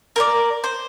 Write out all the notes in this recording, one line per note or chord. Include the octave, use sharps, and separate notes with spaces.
A#4 C5 D5
C5